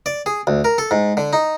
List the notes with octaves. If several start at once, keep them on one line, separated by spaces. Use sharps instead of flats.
D5
G#4
D2
A#4
A4
G#2
D3
D#4